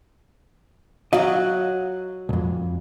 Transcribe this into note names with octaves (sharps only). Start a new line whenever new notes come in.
F#3 F#4 D#5 F5
B1 F2